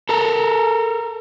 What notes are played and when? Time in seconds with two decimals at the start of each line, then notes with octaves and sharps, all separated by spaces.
0.09 A4 A#4